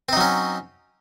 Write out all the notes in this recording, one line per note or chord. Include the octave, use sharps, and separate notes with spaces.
F#3 C4 C#4 D#4